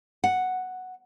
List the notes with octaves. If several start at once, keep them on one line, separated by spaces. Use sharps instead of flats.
F#5